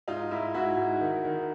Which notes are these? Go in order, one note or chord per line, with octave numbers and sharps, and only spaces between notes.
G#2 D#4 F4
G#2 E4
G#2 E4 F#4
G#2
D#3
D#3